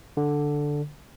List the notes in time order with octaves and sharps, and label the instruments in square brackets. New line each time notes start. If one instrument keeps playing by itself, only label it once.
[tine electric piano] D3